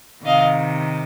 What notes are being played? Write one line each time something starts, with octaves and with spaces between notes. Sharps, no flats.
C3 D#3 D#5 F5